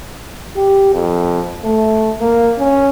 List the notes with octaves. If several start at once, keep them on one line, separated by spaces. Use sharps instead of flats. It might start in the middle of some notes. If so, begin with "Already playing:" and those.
G4
F2
A3
A#3
C#4